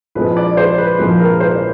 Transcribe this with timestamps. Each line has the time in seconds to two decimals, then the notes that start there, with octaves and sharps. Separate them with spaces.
0.15 A#1 A#2 F3 G#3 C4 B4
0.37 D5
0.57 C5
0.78 B4
0.98 A#1 A#2 F3 G#3 C4
1.20 A#4
1.40 C5